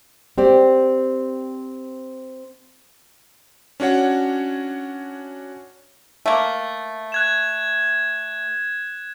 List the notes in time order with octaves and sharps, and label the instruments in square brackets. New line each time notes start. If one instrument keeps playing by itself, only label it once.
[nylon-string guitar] C4 G4 D5
[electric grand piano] C#4 D4 F#4 C#5 F#5
[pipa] A3 A#3
[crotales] F#6 G#6 E7